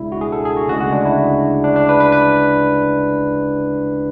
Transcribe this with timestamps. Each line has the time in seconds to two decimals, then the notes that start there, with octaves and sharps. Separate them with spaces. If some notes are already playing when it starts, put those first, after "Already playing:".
Already playing: C#2 B2 G#3 D4 E4
0.12 F#4
0.21 G#4
0.32 A4
0.45 G#4
0.57 F#4
0.68 D2 C#3 G#3 F#4
0.81 F#4
0.93 D4
1.05 E4
1.64 D4
1.76 D4
1.89 B4
2.00 B4
2.12 B4